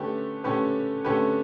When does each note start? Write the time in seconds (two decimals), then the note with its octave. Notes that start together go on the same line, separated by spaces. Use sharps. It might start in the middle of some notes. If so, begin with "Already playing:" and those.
Already playing: D3 A3 C#4 G4 B4
0.44 D3 A3 C#4 G4 B4
1.05 D3 A3 C#4 G4 B4